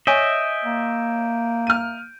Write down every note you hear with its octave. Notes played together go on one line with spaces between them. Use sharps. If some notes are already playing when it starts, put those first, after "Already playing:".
C#5 D#5 E5 G#5 G6 D7
A#3
F6 D#7